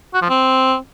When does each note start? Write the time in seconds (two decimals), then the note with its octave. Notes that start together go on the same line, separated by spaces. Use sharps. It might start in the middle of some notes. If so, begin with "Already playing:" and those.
0.14 F#4
0.22 F3
0.29 C4